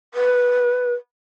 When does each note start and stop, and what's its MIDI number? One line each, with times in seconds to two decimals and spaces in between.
0.14 0.94 71